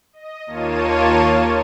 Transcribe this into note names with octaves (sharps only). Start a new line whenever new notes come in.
D#5
D#2 A#3 F4 C#5 A5 D#7